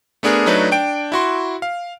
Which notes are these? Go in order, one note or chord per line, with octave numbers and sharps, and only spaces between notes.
A3 B3 D4 G#4 A#4
F#3 A3 D4 D#4 B4 C#5
D4 G5 D7
E4 F#4 C6
F5